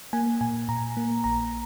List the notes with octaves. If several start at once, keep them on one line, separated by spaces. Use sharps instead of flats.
A#3 G#5
A#2 G#5
A#2 A#5
A#3
A#1 A#5